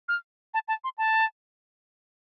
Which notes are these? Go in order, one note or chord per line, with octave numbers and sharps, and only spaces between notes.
F6
A5
A5
C6
A5